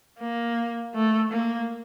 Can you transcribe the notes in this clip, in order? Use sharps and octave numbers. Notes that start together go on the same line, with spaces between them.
A#3
A3
A#3